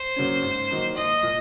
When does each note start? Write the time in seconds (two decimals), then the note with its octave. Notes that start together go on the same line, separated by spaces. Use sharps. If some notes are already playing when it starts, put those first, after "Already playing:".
Already playing: C5
0.16 C#3 F#3 A#3 C#4
0.43 G#2
0.71 D#3 F#3 A#3 D#4
0.97 A#1 D#5
1.23 A#2